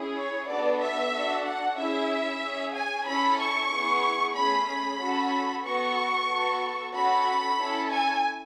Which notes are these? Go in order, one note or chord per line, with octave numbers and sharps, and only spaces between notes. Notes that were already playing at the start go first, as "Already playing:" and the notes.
Already playing: C#4 E4 G#4
C#5
B3 D4 F#4 A4 D5
E5
D4 F#4 A4
F#5
C#4 E4 G#4 E5
C#4 G#4
G#5
C#4 E4 A4 B5
C#6
B3 E4 G#4
A3 C#4 G#4 B5
B5
C#4 F#4 A4
B3 F#4 A4 C#6
B3 F#4 A4
C#4 F#4 A4 B5
C#4 E4 A4
G#5